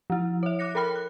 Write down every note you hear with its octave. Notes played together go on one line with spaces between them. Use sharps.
F3 E4
C#5 E5
D6 F#6 A#6 C#7
A4 A#4 G5 B5 F6
F#6